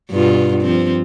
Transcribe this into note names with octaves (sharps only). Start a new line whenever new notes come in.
G2 B2 F4
F3 C4